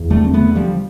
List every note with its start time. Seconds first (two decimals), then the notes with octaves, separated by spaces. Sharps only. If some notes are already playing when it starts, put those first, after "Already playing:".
Already playing: E2
0.10 D3 G3 A3
0.25 C4
0.34 A3 B3
0.41 D3
0.55 F3 G3